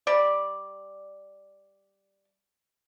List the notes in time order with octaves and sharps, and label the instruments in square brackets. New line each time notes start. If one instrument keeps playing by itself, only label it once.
[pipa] G3 D5